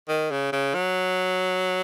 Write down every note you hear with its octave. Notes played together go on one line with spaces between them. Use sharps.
D#3
C#3
C#3
F#3